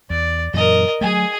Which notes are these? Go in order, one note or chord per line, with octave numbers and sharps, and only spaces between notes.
E2 D5
F#2 A#2 E3 A#4 D#5
F#3 A3 G#4 G#5